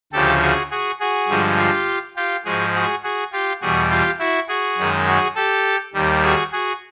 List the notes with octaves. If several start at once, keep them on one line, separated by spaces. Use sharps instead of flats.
D2 C#3 F3 G4 A4
F#4 G#4
F#4 G#4
F#4 G#4
G2 D3 F3 G#3
F4 G4
F4 G4
G#2 F3 G#3 F#4 G#4
F#4 G#4
F#4 G#4
F4 G4
E2 B2 G3 F#4 G#4
F4 G4
E4 F#4
F#4 G#4
F#2 D#3 G#3
F#4 G#4
G4 A4
D#2 D#3 G3
F#4 G#4
F#4 G#4